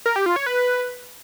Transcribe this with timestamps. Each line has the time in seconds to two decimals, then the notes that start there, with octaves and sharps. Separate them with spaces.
0.06 A#4
0.16 G4
0.26 F4
0.36 C#5
0.46 B4